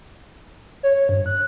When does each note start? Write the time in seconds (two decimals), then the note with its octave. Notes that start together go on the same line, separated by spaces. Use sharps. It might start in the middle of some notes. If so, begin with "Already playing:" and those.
0.83 C#5
1.09 G2
1.26 F#6